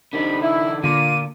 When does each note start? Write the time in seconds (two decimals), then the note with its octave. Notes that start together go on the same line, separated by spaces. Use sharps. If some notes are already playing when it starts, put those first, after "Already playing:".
0.13 C2 D3 D#4 B5
0.42 E4
0.84 A#2 D3 F4 D6 D#7